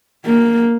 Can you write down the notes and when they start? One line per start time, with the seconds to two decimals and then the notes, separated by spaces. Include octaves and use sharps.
0.25 A#3